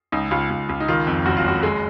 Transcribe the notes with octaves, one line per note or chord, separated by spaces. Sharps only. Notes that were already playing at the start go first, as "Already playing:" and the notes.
C#2 D#4
C#2 F4
C#2
C#2
D#4
D#3 F4
F2
F#1 F#4
F4
F#1 F#4
G#3